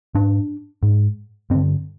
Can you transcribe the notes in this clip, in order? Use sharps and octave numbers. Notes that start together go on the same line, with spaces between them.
G#2 D4
G#2
G2 D3 C4